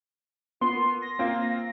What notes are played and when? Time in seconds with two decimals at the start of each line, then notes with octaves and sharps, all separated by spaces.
0.61 B3 F4 C6
0.75 A#4
1.02 A#6
1.19 A#3 C4 F4 F5